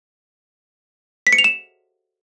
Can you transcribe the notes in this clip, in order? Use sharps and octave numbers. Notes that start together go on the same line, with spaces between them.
B6
C#7
F7
E7